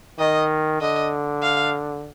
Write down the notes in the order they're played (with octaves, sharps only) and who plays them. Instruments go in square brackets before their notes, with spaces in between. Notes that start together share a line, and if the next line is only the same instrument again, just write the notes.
[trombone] D#3 [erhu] D#5
[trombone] D3 [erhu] D#5
[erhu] F5